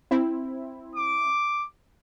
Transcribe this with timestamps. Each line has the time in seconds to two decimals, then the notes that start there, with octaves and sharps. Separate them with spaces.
0.11 C4 E4
0.96 D6